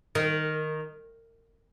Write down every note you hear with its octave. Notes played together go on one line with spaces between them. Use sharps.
D#3